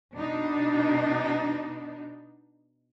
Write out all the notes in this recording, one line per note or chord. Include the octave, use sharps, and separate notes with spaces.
B2 D4 D#4